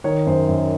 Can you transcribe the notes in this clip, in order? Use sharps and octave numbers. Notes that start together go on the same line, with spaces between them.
D#3 C#5
F#2 C5
F#2